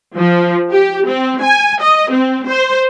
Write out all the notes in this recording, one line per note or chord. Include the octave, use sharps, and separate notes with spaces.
F3
G4
C4
G#5
D#5
C4
C5